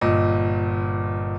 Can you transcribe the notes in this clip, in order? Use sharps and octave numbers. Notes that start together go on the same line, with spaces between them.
G1 A#2 D#5